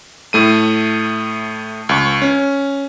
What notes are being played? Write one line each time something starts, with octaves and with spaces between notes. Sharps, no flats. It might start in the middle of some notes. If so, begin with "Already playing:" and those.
A2 A3 D#7
C#2 C#6
C#4